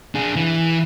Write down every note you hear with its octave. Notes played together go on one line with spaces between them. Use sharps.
D4 G#4
E3